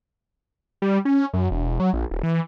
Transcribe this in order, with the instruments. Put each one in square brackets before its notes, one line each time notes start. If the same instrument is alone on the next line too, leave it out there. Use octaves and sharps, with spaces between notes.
[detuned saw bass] G3
C#4
F#2
E1
F#3
A#1
D#1
E3